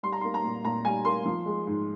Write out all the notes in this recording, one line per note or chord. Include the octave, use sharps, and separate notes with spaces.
G3 C6
A#5
A#3 C6
A#5
A#2
A#2 A#5
G3 G#5
A#3 C6
F3
G#3
G#2